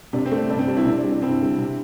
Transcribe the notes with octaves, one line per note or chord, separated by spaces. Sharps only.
C3 D4
C4
A3
D4
G2 D4
C4
G3 D4
C4 E4
C3 D4
D4
G3
D4
G2 C4 E4
D3 G3
C3